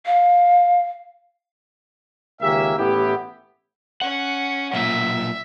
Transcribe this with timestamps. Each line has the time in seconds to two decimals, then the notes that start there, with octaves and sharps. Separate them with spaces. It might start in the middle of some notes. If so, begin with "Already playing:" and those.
0.06 F5
2.41 C#2 D#3 A#3 C#4 G4 E5
2.78 A1 A2 B3 E4 G4
4.01 C#4 F#5
4.73 B1 A#2 E5